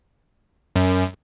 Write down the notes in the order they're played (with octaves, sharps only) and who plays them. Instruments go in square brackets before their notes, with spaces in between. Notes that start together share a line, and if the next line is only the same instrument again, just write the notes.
[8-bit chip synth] F#2